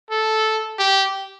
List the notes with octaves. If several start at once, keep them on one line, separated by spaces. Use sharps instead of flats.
A4
G4